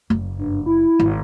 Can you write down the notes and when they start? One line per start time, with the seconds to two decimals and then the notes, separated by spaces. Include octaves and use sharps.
0.10 F#1
0.38 G2
0.66 E4
0.99 G#1